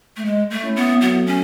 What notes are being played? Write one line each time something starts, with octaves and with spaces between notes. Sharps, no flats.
A3
G#3
A3
C#4 E4
B3
F#3 A3 B3
C#4